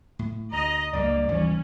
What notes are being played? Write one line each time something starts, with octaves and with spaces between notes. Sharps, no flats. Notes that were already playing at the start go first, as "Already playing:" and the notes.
A2
D2 D#5 A#5
C#2 G2 G3 A#3 D5
G#1 D#2 E3 F3 G3 C#4